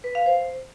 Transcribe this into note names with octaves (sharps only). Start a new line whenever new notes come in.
B4
F5
C5